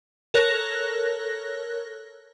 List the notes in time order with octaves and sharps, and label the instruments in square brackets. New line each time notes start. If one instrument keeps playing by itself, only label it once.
[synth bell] A4 A#4 C#5 F#6 A#6